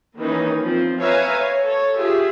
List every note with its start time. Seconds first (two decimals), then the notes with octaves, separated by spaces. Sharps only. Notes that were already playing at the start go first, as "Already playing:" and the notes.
0.17 D#3 E3 A#3 C#4 D#4
0.61 F3 C4
1.00 B4 C#5 E5 F5 G#5 A#5
1.36 C#5
1.65 A4 C#5
1.98 F4 G4 G#4 E5